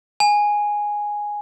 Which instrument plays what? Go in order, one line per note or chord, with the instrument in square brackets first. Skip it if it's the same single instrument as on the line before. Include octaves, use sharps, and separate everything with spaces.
[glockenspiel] G#5